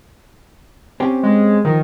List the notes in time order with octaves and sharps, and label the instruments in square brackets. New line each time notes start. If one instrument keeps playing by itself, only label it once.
[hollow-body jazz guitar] C4 C#4 G4
[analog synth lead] G#3
[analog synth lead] D#3 [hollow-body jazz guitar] F3